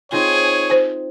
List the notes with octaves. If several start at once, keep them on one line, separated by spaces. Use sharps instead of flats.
C4 D#4 F4 G#4 C#5
C5